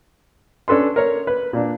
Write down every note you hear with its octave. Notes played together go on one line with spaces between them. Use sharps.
C#4 D4 A4 B4 C6
A#4 C#5
B4
A#2 D4